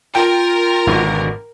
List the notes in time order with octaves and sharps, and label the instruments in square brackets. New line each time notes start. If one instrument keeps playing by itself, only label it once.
[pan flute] F4 [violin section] A#4 [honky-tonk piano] G5
[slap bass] G#1 B2 D3